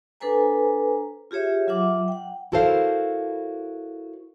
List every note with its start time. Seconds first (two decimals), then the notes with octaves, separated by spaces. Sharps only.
0.20 D4 A4 B4 C5 G#5 A#5
1.31 F4 G4 G#4 C#5 E5
1.67 F#3 F4 E5 F#5 D6
2.08 F#5 G5
2.52 E4 F#4 A4 A#4 C5 F5